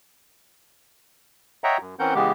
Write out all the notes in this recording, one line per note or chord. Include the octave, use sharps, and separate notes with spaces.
C#5 D#5 E5 F#5 G5 A#5
F#2
E3 C4 C#4 A#4 F#5 G6
C#3 E3 G#3 B3 G4